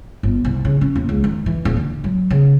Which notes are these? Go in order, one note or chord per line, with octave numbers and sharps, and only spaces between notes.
G1
C2
C#3
C#4
D#2
C#2
D#3
E3
D#1
D3
F#3
C#3